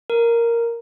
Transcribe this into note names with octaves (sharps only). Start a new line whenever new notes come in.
A#4